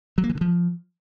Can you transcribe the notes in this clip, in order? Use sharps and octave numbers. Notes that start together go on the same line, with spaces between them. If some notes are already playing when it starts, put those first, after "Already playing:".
F#3
A#3
E3
D3
F3